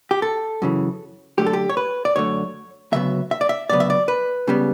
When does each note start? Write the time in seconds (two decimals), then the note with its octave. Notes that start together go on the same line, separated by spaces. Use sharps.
0.11 G4
0.22 A4
0.62 F#2 C#3 E3
1.38 F#2 D3 A3 G4
1.47 A4
1.53 G4
1.69 C#5
1.77 B4
2.05 D5
2.16 F#2 D3 A3 C#5
2.92 D2 C#3 F#3 B3 E5
3.31 E5
3.41 D5
3.49 E5
3.70 D2 C#3 F#3 B3 D5
3.80 E5
3.90 D5
4.08 B4
4.47 C#2 C#3 G3 B3